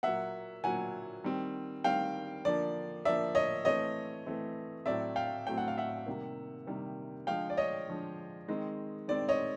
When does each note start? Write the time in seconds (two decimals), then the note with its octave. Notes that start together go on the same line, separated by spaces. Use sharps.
0.03 A#2 F#3 A#3 E5 F#5
0.64 A#2 F#3 A#3 F#5 G#5
1.24 D#3 G3 C4
1.84 D#3 G3 C4 F5 G5
2.45 D3 F3 A#3 D5
3.05 D3 F3 A#3 D5 E5
3.35 C#5 D#5
3.65 E3 A3 C4 C#5 D#5
4.26 E3 A3 C4
4.86 A2 F#3 A3 C4 D5 E5
5.16 F5 G5
5.47 A2 F#3 A3 C4 G5
5.58 F#5
5.68 F5
5.78 E5 F#5
6.06 C3 D#3 G3 A#3
6.67 C3 D#3 G3 A#3
7.27 D3 F3 G#3 F5 G5
7.50 D5
7.57 C#5 D#5
7.89 D3 F3 G#3
8.48 D#3 G#3 C4
9.08 D#3 G#3 C4 D5
9.29 C#5 D#5